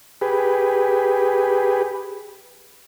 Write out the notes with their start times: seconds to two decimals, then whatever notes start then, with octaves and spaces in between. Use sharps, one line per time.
0.21 G4 G#4 B4